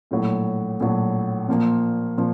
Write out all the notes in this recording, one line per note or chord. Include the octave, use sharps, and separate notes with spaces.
A#1 A2 F#3
A#1 A2 F#3
A#2 F3 A#3
A#2 F3